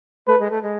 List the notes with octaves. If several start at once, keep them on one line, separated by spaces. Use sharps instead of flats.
A3 B4
G#3
A3
G#3